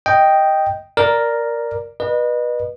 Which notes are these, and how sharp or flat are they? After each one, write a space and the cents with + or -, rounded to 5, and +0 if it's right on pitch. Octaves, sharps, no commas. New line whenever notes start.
D#5 +0 G5 +0
A#4 +0 D5 +0
B4 -25 D#5 -35